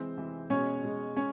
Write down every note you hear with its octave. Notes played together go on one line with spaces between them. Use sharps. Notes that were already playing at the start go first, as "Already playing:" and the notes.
Already playing: C3 E3 G#3 C4 C5
C3 E3 G#3
B2 G#3 C#4 C#5
B2 G#3
G#3 C#4 C#5